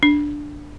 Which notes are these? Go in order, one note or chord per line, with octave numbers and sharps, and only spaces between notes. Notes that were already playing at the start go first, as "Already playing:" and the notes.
D4